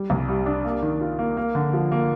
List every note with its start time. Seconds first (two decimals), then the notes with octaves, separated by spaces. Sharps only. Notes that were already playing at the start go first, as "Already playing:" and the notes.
Already playing: G3
0.10 C2
0.28 G3
0.46 D4
0.65 A#3
0.82 D#3
1.01 F4
1.19 A#3
1.37 A#3
1.55 D3
1.73 F3
1.92 A#3